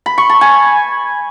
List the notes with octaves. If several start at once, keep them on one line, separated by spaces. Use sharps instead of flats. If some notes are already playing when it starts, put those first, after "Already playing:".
B5
C#6
A5
G#5